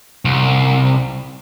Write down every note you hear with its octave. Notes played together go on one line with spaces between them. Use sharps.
C2